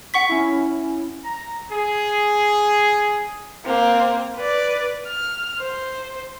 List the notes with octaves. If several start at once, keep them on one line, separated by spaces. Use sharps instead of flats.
F#5 C#6 B6
C#4 E4
A#5
G#4
A#3 C4
B4 D5
F6
C5